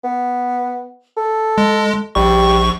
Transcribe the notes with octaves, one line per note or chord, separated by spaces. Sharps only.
B3
A4
G#3
A#1 G3 C#6